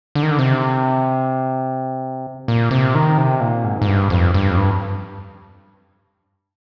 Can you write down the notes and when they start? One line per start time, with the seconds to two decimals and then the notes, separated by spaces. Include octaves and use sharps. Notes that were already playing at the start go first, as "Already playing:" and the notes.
0.15 D3
0.23 D#3
0.31 D3
0.38 C3
2.48 A#2
2.71 C3
2.95 D#3
3.18 C3
3.40 A#2
3.64 G#2
3.82 G#2
3.87 G2
4.10 F2
4.34 G2
4.51 F2
4.57 G2